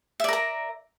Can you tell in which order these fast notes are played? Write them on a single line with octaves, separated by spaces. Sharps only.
E5 D5 A#4 A#5